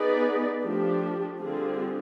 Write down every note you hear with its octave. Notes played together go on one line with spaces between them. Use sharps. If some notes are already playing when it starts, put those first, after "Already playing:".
Already playing: B3 D#4 G#4 B4 D5
F3 A3 D4 G4
D3 G3 C4 F4 G#4